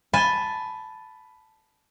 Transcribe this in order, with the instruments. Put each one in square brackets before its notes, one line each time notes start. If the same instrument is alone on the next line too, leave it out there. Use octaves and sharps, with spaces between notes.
[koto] G#5 A5 [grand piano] B5 G7